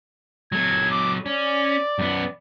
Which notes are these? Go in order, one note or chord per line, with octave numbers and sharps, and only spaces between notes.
F#3 A4 G#6
D6
C#4 D5
F#2 B3